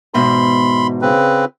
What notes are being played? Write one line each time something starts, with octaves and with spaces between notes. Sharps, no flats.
E2 G#2 B2 B5 C6
C#3 C4 B4